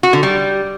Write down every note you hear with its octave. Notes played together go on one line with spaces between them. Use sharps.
F#4
D3
G3